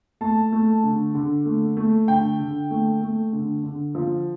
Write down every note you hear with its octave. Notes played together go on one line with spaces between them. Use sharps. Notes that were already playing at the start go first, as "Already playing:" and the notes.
A3 A5
A3
D3
D3
A3
A3
D3 G5
D3
A3
A3
D3
D3
F3